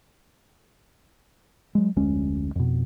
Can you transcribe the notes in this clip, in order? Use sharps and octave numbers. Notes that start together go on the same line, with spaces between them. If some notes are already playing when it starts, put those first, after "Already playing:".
F#3 G#3
F1 D2 G#3 C#4
F2 B2